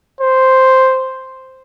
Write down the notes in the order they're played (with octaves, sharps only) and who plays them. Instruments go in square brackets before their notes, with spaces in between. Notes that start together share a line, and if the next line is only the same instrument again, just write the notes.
[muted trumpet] C5